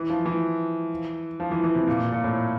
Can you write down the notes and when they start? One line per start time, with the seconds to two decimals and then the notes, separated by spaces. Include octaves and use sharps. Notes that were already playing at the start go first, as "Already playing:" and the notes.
Already playing: E3
0.10 F3
0.26 E3
1.40 F3
1.51 E3
1.64 E3
1.76 C3
1.88 A#2
2.12 A#2
2.24 A2